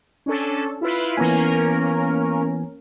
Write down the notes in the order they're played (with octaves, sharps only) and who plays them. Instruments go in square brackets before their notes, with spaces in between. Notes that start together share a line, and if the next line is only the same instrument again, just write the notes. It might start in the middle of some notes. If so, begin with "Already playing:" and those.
[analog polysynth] C#4 D4 A4
E4 F4 B4
[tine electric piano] E3 B3 G#5 [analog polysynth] A#3 C#4 A#4